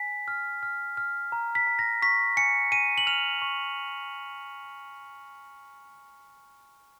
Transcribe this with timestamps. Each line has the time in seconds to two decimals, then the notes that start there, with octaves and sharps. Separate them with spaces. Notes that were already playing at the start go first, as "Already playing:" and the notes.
Already playing: G#5 B6
0.28 F6
0.63 F6
0.97 F6
1.32 A#5
1.55 B6
1.67 A#5
1.79 A#6
2.02 C#6 B6
2.37 G#5 C#7
2.72 G#5 D#7
2.98 F#7
3.07 F6 F7
3.42 C#6